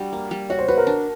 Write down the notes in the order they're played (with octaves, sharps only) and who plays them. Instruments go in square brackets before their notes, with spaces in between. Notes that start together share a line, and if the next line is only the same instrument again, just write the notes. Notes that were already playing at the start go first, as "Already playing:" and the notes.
Already playing: [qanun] G3 D4 F#4
A#3
G3
[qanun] F#4 [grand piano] C#5
[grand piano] C5
[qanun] F#4 [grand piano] B4
[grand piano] A#4
[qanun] D4